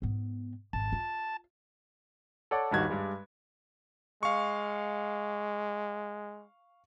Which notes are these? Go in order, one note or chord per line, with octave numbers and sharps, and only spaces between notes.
G#2 B3
G#1 A5
F4
A4 C#5 D5 F#5 D6
D#1 G2 D#3 G3 F#4 G#6
G2 G3 G#3
G#3 F5 C#6